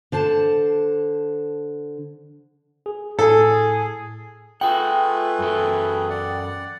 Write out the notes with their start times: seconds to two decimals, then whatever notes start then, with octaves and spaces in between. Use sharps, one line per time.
0.12 D3 C5 A5
2.86 G#4
3.19 A2 G#4 A4
4.61 A3 F4 G#4 B4 F#5 G5
5.39 F#2 A4
6.10 D5 F#5